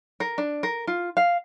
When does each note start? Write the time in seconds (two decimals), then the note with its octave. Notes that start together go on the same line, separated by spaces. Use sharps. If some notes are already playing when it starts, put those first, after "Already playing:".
0.20 A#4
0.38 D4
0.63 A#4
0.87 F4
1.17 F5